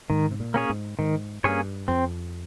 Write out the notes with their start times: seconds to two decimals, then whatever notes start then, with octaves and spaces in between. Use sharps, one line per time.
0.10 G#2 D#3
0.31 C3
0.40 A#2
0.54 A#3 C#4 G#4 C#5
0.70 G#2
0.99 G#2 D#3
1.44 G2 A#3 C#4 G#4 C#5
1.88 F2 C4